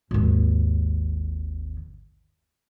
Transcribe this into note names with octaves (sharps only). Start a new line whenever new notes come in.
G#1 D#2